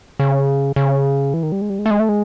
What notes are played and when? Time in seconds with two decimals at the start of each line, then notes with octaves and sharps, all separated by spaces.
0.20 C#3
0.76 C#3
1.34 E3
1.43 D#3
1.52 G3
1.61 G#3
1.70 G3
1.79 G#3
1.86 A3
1.91 G#3
1.99 A3
2.09 G#3